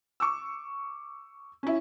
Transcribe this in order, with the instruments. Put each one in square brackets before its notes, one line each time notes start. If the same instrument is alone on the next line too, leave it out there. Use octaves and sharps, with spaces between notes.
[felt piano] C#6 D6 E6
C#4 E4